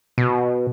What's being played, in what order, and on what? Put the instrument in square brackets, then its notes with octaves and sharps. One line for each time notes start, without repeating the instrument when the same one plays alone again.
[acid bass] B2